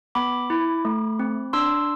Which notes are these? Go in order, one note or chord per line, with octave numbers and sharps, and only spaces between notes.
B3 B5 D6
E4
A3
C4
D4 C6 E6